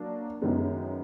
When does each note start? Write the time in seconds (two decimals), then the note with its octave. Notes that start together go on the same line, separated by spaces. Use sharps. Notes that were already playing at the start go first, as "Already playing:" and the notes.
Already playing: F#3 A#3 D4
0.42 F#2 D#3 G#3 B3